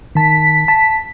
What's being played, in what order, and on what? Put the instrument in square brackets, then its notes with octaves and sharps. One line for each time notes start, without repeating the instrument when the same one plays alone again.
[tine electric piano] D#3 A5 [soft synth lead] B6
[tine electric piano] A5